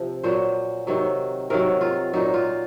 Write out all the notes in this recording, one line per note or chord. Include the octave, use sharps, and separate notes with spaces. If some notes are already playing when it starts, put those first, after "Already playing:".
Already playing: C3 F3
A#2 F#3 C5
C3 D#3 F#3
C3 D#3 F#3 A#4
F4
A#2 F#3 D#4
F4